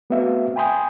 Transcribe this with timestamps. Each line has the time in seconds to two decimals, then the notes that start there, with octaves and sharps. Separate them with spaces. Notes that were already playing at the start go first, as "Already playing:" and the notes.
0.10 A3 B3 C4 F#4 E5 F5
0.56 G5 G#5 B5 C6 D#6 G6